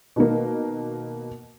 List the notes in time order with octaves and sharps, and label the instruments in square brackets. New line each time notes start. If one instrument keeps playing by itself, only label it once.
[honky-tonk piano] B2 D#3 A#3